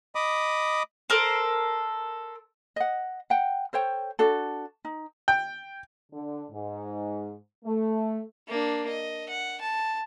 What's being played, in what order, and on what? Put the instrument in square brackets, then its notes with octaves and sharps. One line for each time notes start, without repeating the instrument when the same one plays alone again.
[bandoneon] D#5 B5 D6 D#6
[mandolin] A4 A#4 C5
[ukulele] D#5 F#5
F#5 G5
A4 C5 C#5 G5
D4 F#4 A4
D#4
[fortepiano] G5
[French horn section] D3
G#2
A3
[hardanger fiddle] A#3 D4
D#5
F#5
A5